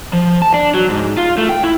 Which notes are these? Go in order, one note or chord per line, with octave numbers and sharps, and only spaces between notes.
F3
A5
D4
F#3
G#2
F4
A3
G5
E4